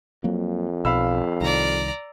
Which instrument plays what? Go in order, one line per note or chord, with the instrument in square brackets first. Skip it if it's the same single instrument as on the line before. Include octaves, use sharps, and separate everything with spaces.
[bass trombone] F2 [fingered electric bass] F#3 A#3
[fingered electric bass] B1 B2 [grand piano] F5 B5 E6
[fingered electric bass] C2 D#3 [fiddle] D5 A#5